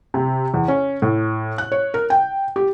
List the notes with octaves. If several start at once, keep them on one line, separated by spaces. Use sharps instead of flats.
C3
E2
C#4
A2
F#6
C#5
A#4
G5
G4